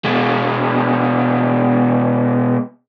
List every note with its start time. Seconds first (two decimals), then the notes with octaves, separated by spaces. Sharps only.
0.05 B2 G#3